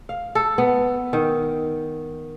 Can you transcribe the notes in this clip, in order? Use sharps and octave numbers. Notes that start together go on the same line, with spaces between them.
F5
A4
B3
D#3